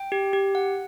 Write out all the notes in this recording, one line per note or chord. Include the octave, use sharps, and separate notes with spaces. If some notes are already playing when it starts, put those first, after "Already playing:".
Already playing: G5
G4
G4
F#5